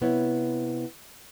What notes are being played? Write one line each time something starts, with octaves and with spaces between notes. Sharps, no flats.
C3 B3 E4 C#5